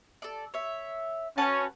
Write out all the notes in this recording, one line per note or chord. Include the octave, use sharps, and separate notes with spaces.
A4 D5
C#5 E5
C#4 F#4 B4 A5